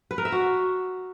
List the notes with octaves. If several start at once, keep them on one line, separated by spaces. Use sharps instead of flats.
B4
A#4
E5
F#4